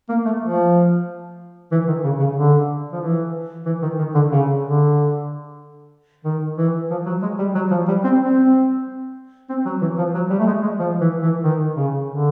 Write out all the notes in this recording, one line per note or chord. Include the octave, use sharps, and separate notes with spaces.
A#3
A3
F3
E3
D#3
C#3
C#3
D3
F3
E3
E3
D#3
D#3
D3
C#3
D3
D#3
E3
F3
F#3
G#3
G3
F#3
F3
G3
C4
C4
C4
F#3
E3
F3
F#3
G3
A3
G#3
G#3
F3
E3
E3
D#3
C#3
D3